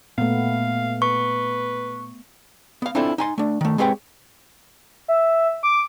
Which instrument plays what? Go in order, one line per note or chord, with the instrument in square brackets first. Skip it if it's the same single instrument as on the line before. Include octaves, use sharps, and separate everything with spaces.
[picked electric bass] A#2 [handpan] A3 B3 [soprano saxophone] F5
[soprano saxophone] B4 [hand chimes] C#6
[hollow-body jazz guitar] B3 F5
C4 D4 E4 F4 A4 C5
D#4 G#5 C6
A3 D4
D#3 A3
G#3 C4 G4 B4 C#5 G5
[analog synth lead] E5
D6